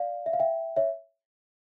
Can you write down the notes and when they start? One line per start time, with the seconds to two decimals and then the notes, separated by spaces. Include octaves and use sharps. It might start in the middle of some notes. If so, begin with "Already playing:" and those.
Already playing: D5 F5
0.26 E5
0.33 F5
0.39 E5 G5
0.76 C#5 E5